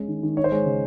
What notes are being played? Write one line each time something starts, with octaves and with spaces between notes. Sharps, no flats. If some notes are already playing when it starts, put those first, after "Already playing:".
Already playing: G#3 C#4
D#3
D#3
D#4 C#5
C5
G#3 C#5
C#3